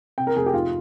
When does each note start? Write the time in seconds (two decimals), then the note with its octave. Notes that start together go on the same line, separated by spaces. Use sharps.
0.18 C3 G5
0.27 A#4
0.36 F1 G#4
0.46 G4
0.54 G#2 F4